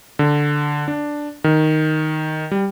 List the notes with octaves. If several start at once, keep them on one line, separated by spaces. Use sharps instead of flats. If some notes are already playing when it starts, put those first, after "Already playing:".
D3
D4
D#3
G3